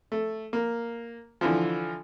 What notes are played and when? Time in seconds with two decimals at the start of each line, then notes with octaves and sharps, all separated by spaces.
0.12 A3
0.53 A#3
1.41 D3 E3 F3